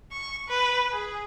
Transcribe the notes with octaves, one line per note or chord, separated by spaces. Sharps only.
C#6
B4
G#4